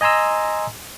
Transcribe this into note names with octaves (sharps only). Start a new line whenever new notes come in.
D#5 G#5 A#5 C6 E6